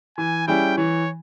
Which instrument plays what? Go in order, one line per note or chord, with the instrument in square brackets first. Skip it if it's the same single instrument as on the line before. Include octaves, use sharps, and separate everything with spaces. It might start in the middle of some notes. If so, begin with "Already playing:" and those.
[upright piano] E3 [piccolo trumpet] G#5
[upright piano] G3 C#4 E4 G#4 [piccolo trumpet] G5
[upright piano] E3 [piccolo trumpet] C#5